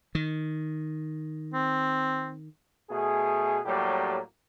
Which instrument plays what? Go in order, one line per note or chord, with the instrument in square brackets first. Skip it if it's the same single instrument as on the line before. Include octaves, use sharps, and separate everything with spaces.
[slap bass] D#3
[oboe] C4
[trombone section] B2 A3 G#4
A2 F#3 G3 A#3 G4